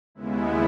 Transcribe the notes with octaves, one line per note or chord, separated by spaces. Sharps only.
D#2 C#3 G#3 B3 E4